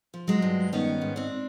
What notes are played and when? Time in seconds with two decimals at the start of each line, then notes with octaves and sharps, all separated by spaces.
0.14 F3
0.28 F#3 G#3
0.42 G2
0.73 D#3 B3 C#4
1.01 G#2
1.16 C4 D4